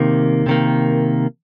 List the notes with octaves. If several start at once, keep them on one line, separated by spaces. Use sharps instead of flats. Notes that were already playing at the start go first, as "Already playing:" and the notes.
Already playing: C3 D#3 A#3
C3 D#3 A#3